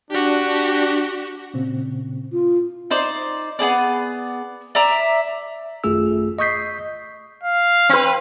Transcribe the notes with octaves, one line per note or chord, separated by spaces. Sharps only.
D4 F#4 G4
A#2 C#3 C4
F4
D#4 C5 D5
B3 E4 G#4 D5
D5 E5 A#5 D6
G#1 F#2 A3 F4 G#4 E6
D#5 C#6 D#6 G6 B6 C7
F5
C4 B4